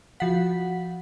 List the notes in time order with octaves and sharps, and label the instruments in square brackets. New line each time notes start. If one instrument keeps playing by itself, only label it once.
[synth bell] F3 F#5 [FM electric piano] F#4 B6